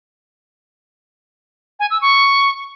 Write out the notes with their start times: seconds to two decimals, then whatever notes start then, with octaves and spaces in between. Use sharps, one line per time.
1.80 G#5
1.91 E6
2.02 C#6